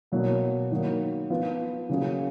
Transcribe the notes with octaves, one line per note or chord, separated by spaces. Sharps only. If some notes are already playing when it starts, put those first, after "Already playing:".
B2 F#3 A#3
D#3 F#3 A#3
F3 B3 F4 B4
C#3 F#3 A#3 F4 G#4